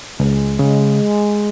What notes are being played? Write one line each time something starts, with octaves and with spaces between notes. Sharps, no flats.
C#2 G#3
C#3 G#3